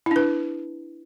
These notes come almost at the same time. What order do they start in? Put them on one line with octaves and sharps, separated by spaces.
E4 D4 B4